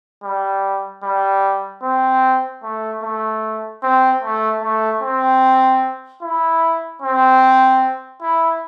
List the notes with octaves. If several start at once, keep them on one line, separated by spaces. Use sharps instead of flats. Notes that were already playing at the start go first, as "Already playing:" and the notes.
G3
G3
C4
A3
A3
C4
A3
A3
C4
E4
C4
E4